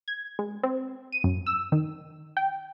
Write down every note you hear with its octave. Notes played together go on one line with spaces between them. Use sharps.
G#6
G#3
C4
D#7
F#2
E6
D#3
G5